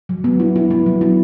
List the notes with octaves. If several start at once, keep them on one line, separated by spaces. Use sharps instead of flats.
F#3
B3
E4
E4
B3
F#3
E4